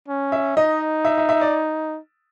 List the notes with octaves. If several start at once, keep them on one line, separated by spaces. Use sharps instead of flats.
C#4
E5
D#4 D#5
E5
E5
E5
D5